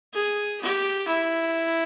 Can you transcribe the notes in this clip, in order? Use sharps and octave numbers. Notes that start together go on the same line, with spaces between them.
G#4
G4
E4